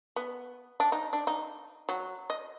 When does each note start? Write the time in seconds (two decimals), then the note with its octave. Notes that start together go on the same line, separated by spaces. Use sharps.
0.16 B3
0.80 D4
0.92 D#4
1.13 D4
1.27 D#4
1.89 F#3
2.30 D#5